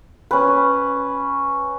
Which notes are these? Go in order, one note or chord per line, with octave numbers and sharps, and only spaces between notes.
C#4 B4